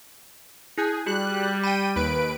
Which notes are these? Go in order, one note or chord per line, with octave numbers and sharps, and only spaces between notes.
E4 G#4 F#6 G6
G3 F#4 G#4 F#6
G5 B5 D#7
D#2 B4 D7